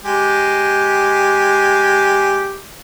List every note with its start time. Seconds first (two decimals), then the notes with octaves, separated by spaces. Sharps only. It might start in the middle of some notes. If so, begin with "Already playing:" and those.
0.04 G#3 G4